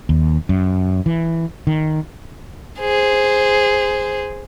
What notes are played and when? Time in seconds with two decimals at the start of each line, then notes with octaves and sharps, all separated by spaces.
0.09 D#2
0.49 F#2
1.06 E3
1.67 D#3
2.79 G#4 C5